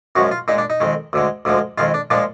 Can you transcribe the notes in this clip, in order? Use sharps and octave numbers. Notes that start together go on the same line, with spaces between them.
F#2 F3 G#3 F#4
F4
A#2 G#3 D#4
D4
D#4
F2 D#3 G#3
D2 D3 G#3
D2 D3 F3 G#3
F2 D#3 G#3 F4
D4
A#2 F3 G#3 D4